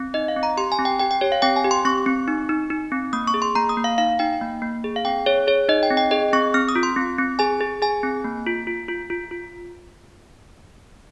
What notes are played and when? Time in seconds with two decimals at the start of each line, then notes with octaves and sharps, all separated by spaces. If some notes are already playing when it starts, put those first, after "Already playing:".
Already playing: C4
0.14 D#4 D#5
0.28 F5
0.36 C4
0.43 A#5
0.57 G4 C6
0.72 G#5
0.79 C4
0.85 G5
0.99 G4 G5
1.11 G5
1.21 G4 C#5
1.32 F5
1.42 C4 G5
1.56 G#5
1.64 G4
1.71 C6
1.85 C4 C#6
2.06 C4
2.28 D#4
2.49 D#4
2.70 D#4
2.92 C4
3.13 A#3 D#6
3.27 C#6
3.34 G#4
3.42 C6
3.55 A#3 A#5
3.69 D#6
3.77 A#3
3.84 F5
3.98 D#4 F5
4.19 D#4 G5
4.41 A#3
4.62 A#3
4.84 G#4
4.96 F5
5.05 C4 G5
5.26 G#4 C#5
5.47 G#4 C#5
5.69 D#4 D#5
5.83 G5
5.90 C4
5.97 G5
6.11 G#4 D#5
6.33 C4 C#6
6.54 C4 F6
6.69 D#6
6.75 F4
6.83 C6
6.96 C4
7.18 C4
7.39 G#4 G#5
7.61 G#4
7.82 G#4 G#5
8.03 C4
8.24 A#3
8.47 F4
8.67 F4
8.88 F4
9.10 F4
9.31 F4